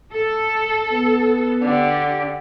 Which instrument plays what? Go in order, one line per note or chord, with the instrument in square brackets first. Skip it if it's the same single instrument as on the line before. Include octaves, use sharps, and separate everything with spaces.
[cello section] A4
[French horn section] B3
[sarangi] D3 [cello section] G4